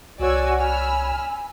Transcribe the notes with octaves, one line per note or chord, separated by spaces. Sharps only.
C2 F#4 C#5 D5 G#5 E6
G#5 B5 E6 F6